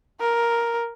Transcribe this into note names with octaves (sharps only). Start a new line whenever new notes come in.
A#4